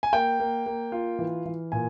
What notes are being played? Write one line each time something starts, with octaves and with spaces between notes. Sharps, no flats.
G#5
A#3 G5
A#3
A#3
F4
E3
E3
A#2 G#5